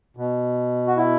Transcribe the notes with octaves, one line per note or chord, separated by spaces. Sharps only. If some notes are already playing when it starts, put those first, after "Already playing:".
B2
F#4
E4